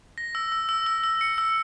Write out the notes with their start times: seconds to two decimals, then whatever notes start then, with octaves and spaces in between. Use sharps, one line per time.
0.18 A#6
0.35 E6
0.52 E6
0.69 E6
0.86 E6
1.04 E6
1.21 C#7
1.38 E6